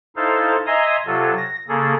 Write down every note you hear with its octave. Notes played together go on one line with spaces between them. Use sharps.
D#4 E4 A4 C5 F5
D#5 E5 G#5 A#5 C6 D#6
C3 F#3 F4 A4
A#6
C#3 A#3 G#4 A4